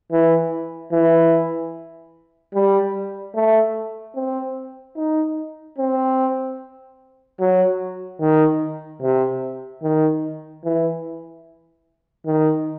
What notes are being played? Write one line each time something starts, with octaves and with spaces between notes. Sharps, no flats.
E3
E3
G3
A3
C4
D#4
C4
F#3
D#3
C3
D#3
E3
D#3